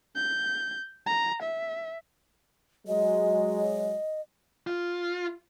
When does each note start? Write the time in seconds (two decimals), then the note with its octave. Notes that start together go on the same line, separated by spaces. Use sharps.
0.16 G6
1.07 A#5
1.42 E5
2.87 F#3 G#3 D#5
4.67 F4